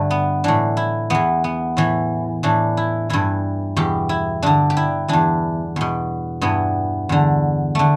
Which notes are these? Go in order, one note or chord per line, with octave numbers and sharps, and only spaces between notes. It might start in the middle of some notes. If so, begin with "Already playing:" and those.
Already playing: G2 D3 A3
B3
A2 E3 D4
E4
E2 E3 B3
B3
A2 E3
A2 E3 D4
E4
G2 E3 E4
E2 B2 G4
E4
G2 D3 D4
G4
E4
E2 E3 D4
E2 B2
G2 E3 B3
E2 D3
D3 A3